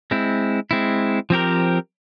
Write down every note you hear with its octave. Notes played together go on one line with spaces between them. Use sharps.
G#3 C4 E4
G#3 C4 E4
F3 C4 G4 A#4